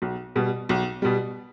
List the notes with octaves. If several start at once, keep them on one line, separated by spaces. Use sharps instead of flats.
B1
B2 G3
B1
B2 G3